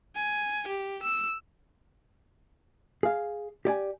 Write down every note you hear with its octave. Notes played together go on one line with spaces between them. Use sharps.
G#5
G4
E6
G#4 F5
G4 D5 G#5